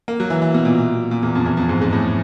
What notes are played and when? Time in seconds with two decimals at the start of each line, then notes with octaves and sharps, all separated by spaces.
0.08 A#3
0.20 F#3
0.30 E3
0.42 E3
0.54 B2
0.65 A#2
1.11 A#2
1.23 E2
1.35 F2
1.46 E2
1.57 F2
1.69 G#2
1.81 G#2
1.93 A2